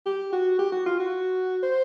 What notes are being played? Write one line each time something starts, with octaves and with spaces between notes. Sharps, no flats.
G4
F#4
G4
F#4
F4
F#4
C5